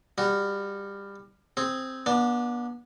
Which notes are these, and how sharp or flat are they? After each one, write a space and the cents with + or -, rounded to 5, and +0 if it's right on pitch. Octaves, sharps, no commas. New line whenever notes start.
G3 +20 F#4 +5
C4 +0 G#4 +0
B3 -35 D4 +0